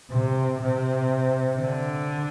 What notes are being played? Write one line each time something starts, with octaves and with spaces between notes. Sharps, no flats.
C3
C3
D3